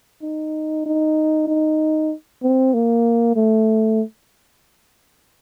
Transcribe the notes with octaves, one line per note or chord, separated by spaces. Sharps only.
D#4
D#4
D#4
C4
A#3
A3